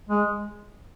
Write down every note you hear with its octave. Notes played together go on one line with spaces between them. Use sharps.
G#3